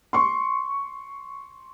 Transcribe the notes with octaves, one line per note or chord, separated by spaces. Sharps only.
C6 C#6